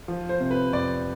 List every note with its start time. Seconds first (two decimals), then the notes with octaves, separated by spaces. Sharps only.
0.08 F3
0.29 C5
0.40 C3
0.51 B4
0.72 F2 D5